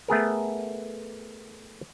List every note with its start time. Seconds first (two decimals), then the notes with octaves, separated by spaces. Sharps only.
0.08 A3 B3 G#4 A#4